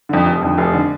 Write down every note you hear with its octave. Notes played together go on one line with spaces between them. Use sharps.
F2 D3
F1
F2 D3
F1
D3